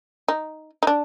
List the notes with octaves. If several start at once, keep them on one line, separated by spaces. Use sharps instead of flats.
D#4
D#4
D4